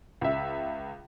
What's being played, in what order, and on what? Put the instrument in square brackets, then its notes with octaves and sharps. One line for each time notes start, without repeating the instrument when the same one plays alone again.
[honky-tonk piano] C#2 E5